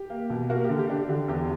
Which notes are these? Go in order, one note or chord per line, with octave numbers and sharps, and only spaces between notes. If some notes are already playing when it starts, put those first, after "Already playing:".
Already playing: G4
A#3
B2
A#3 F#4 A#4
D3 G4
G4
D4
D3 G4
E2 G4